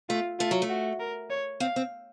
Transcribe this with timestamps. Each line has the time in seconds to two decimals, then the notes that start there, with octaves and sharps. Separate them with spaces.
0.09 A3 F4
0.39 A3 F4
0.51 F#3
0.62 A3
0.70 F#4
1.00 A#4
1.30 C#5
1.60 C4 F5
1.76 C4